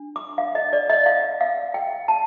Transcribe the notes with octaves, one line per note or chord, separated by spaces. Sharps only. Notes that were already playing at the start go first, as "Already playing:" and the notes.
Already playing: D4
D6
F5
D#5
D5
D#5
F5
F5
G5
A5